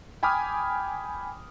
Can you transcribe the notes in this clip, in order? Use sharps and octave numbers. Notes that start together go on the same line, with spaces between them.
G5 G#5 B5 D6 D#6 F6